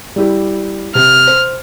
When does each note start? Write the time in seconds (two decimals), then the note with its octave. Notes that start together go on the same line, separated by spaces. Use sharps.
0.16 G3 E4 G4
0.95 C3 F6
1.27 C5